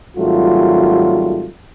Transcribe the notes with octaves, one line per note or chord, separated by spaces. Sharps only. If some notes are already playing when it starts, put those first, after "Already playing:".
G#1 F#3 G3 A3 F4